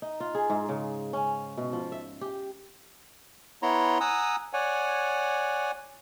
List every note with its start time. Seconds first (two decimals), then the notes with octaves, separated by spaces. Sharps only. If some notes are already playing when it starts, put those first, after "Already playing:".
0.02 D#4
0.20 F4
0.35 G#4
0.50 G#2
0.69 C#3
1.13 C#4
1.57 B2
1.73 F3
1.92 E5
2.21 G4
3.62 B3 E4 C#5 A#5 C6
4.00 F#5 G#5 A#5 D#6 E6
4.53 C#5 D5 F#5 G#5